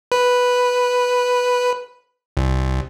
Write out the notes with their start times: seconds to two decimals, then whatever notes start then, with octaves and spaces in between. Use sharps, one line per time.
0.12 B4
2.37 C2